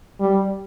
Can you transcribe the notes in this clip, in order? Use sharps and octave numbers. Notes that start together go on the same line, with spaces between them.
G3